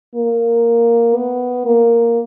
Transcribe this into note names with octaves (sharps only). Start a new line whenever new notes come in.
A#3
B3
A#3